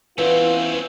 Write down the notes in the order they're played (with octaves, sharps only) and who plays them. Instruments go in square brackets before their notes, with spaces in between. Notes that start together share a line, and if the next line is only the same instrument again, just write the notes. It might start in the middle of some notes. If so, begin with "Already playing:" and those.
[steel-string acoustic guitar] E2 E3 [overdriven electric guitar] C4 C#4 [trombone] F4 [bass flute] B4